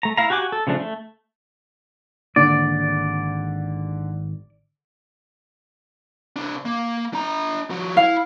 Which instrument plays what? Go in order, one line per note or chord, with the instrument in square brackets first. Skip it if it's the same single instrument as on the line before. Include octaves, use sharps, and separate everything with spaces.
[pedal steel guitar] A3 A#5
E4 F5 A#5
F#4 G4 F#5 G#5 D6
A4
C#3 F3 A3 D4
A3
[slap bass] G#1 A#3 [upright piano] D3 [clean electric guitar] D5
[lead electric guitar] C3 D4
A#3
D4 A#5
F3 F#4
[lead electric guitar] E4 [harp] F5